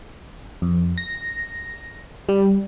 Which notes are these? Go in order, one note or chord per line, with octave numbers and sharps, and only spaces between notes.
F2
A#6
G3